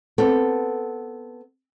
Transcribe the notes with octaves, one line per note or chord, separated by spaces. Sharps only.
B3 C4 A4